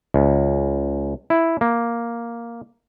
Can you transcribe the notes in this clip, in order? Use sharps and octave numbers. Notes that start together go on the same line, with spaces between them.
C#2
E4
A#3